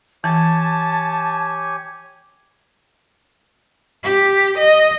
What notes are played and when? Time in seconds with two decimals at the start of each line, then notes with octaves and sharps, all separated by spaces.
0.24 E3 G4 C#5 G#5 A5
4.04 G4
4.58 D#5